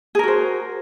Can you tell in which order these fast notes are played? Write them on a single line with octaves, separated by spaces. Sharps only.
G#4 A#4 F#4 C5